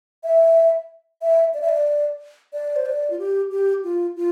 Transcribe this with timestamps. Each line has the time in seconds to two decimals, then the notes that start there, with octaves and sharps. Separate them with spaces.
0.24 E5
1.22 E5
1.54 D5
1.61 E5
1.69 D5
2.53 D5
2.76 C5
2.86 D5
3.10 F4
3.19 G4
3.51 G4
3.84 F4
4.16 F4